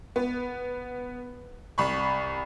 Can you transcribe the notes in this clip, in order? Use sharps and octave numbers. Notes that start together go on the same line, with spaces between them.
B3
C2 B5 C#6